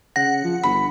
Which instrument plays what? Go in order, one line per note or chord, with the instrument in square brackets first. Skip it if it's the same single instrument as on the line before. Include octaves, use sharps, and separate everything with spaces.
[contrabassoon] C#3 [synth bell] F#5 [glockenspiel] A#6
[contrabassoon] F3
[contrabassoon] G1 [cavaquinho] B5